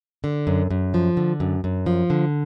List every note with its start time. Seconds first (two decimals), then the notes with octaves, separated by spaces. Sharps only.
0.24 D3
0.47 F#2
0.71 F#2
0.94 F3
1.17 D3
1.40 F#2
1.64 F#2
1.86 F3
2.10 D3